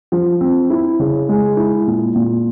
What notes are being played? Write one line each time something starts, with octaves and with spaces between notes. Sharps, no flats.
F3
C4
E4
C#3
G#3
E4
A#2
A#2